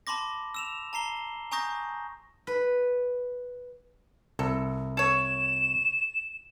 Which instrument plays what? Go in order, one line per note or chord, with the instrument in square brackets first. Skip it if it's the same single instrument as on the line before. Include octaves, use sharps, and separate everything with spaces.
[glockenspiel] A5 B5 C6 D6 A#6
E6 E7 F7
A5 A#5 C7 G7
G#5 A#5 C#6 D#6 G6 A#6
[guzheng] B4
[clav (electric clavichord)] C2 [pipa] A4
[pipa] A4 C#5 [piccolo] E7